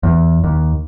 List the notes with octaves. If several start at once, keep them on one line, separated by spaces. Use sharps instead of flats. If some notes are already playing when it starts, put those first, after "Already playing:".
E2
D#2